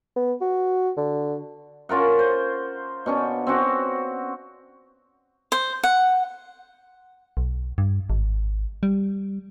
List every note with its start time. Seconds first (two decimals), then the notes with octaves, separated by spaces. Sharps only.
0.16 B3
0.41 F#4
0.97 D3
1.89 C#4 F4 A#4 F#5
2.19 C5
3.06 B2 C#4 D4
3.47 C4 C#4 F#4
5.52 C5
5.83 F#5
7.37 B1
7.78 G2
8.10 G#1
8.83 G3